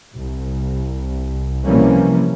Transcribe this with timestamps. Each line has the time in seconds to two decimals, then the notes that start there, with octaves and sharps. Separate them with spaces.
0.16 C2
1.65 C3 E3 F3 G3 A#3 C#4